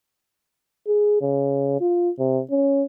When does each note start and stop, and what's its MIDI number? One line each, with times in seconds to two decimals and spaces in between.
0.88 1.21 68
1.21 1.77 49
1.81 2.10 65
2.19 2.41 48
2.51 2.83 61